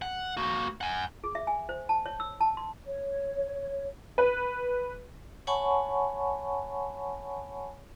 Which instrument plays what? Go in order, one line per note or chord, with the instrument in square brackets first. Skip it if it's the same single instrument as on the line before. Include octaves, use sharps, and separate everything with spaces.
[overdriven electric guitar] F#5
A#3 F#4
F#5 G#5
[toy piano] G#4
E5
G#5
C5
A5
C#5
E6
A5
C6
[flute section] C#5
[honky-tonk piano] B4
[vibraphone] C#5 F#5 G#5 A5 B5 C#6